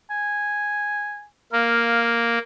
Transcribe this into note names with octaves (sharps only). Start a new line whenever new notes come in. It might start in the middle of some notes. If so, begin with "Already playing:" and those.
G#5
A#3 F5